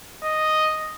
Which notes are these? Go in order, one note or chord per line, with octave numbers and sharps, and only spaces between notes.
D#5